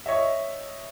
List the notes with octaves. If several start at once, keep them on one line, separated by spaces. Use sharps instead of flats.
C#5 D#5 E5